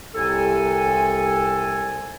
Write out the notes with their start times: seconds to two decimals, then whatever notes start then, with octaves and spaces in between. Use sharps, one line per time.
0.15 C2 A4 G#5